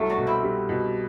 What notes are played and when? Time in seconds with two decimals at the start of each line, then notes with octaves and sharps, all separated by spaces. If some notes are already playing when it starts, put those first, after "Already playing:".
Already playing: C2 F#3 A3
0.09 D4 F#4
0.18 B2
0.27 C4 E4
0.43 G3
0.69 B2